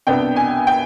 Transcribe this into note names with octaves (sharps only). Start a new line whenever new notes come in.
C2 B2 B3 D4 G5
G#5
G5